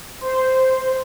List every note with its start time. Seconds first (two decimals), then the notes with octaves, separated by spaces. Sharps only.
0.21 C5